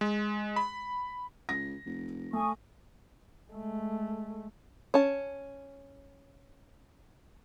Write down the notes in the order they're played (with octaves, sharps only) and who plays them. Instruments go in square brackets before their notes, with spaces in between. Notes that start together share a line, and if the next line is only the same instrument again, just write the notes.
[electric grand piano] G#3
B5
[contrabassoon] C#2 [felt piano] A#6
[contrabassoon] F1
[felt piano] A3 [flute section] G#5 C#6 D#6
[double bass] G#3 A3
[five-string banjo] C#4 A5